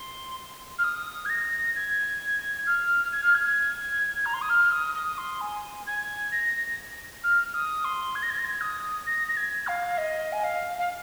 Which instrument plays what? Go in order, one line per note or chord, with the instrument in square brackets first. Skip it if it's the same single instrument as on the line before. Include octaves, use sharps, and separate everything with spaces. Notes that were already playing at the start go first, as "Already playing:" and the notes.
Already playing: [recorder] C6
F6
D#6
G#6
A#6
G#6
F6
G#6
F6
G#6
A#5
C6
D#6
F6
D#6
D#6
C6
G#5
G#6
A#6
F6
D#6
C6
G#6
A#6
G#6
A#6
G#6
D#6
A#6
A#6
G#6
F5
D#5
G#5
F5
F5